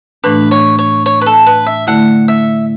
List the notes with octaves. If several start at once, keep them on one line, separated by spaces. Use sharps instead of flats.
A2 E3 A3 D4 B4
C#5
C#5
C#5
B4
A4
B4
E5
D3 A3 E4 F#5
E5